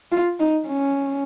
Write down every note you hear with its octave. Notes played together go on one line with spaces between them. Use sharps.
F4
D#4
C#4